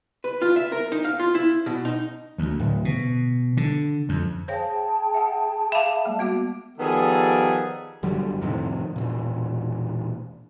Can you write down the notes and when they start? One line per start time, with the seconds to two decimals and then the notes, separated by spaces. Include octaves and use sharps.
0.24 B4
0.41 F4
0.56 E5
0.72 A#4
0.92 D#4
1.04 F5
1.20 F4
1.35 E4
1.66 B2
1.85 D#4
2.38 D2
2.60 D1
2.85 B2
3.57 D3
4.09 F2
4.48 G#4 C5 C#5 F5 G5 A5
5.14 E5 F#5
5.72 E5 F5 B5 D6
6.05 G3 G#3 A#3
6.19 B3 F#4 D6
6.79 D#3 F3 G3 B3 G#4 A4
8.03 G1 F#2 D3 G3
8.41 F2 A2 C3 D#3
8.96 E1 A#2